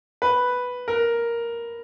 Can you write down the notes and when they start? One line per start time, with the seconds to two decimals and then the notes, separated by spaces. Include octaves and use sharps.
0.22 B4
0.88 A#4